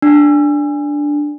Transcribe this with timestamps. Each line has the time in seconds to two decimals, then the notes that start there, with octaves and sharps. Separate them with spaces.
0.02 D4